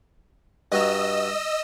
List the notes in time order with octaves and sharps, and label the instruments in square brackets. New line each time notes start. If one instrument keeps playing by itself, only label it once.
[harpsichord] G2 F#4 A#5 [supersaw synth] D#5 E6